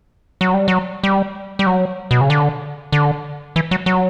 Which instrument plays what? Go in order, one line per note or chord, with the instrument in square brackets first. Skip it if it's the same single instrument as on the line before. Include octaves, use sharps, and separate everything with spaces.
[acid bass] F#3
G3
F#3
G3
G3
F#3
B2
C#3
D3
D3
E3
F#3
F#3